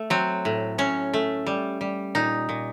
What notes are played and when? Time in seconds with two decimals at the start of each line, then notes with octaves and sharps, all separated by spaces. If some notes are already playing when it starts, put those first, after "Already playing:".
Already playing: A3
0.10 F#3 C4
0.45 A2
0.78 A2 C#4
1.14 A3
1.47 G3
1.81 G3
2.15 A#2 D#4
2.49 A#2